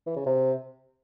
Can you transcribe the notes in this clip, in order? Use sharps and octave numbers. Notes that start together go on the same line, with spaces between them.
E3
C#3
C3